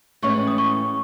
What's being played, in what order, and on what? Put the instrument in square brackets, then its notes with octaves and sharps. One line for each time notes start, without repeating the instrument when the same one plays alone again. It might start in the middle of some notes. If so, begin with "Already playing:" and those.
[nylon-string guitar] A2 E3 G#3 C#4 [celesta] C#6
[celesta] D#6
C#6